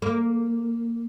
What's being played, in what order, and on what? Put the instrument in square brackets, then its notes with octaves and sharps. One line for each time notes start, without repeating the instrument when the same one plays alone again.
[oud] A#3